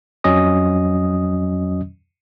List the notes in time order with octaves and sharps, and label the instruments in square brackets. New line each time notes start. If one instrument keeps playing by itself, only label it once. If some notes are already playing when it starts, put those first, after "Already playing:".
[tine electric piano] F2 F#3 C#4 D#5 D#6